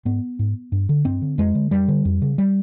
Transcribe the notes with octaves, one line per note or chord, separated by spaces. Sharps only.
G#2 B3
G#2
G2
D3
G2 C4
D3
F2 G#3
D3
F2 G3
D3
F2
C#3
G3